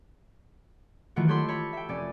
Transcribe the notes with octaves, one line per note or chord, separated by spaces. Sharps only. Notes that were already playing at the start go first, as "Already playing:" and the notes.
D#3 E3 F#3 A3 F4 F#4
G4 A4 C#5 B5 C6 E6
C#5 B5
E5 G5
F1 C#4 D5 G#5